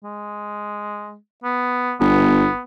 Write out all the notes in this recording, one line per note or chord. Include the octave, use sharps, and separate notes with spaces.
G#3
B3
G1 B3